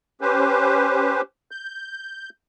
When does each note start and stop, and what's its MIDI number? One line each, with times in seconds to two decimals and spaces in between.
0.21 1.21 61
0.21 1.21 67
0.21 1.21 71
0.21 1.21 72
1.51 2.29 91